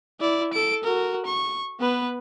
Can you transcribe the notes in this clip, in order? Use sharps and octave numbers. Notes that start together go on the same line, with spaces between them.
E4 D5
A4 D7
F#4 A#4
C#6
B3 B4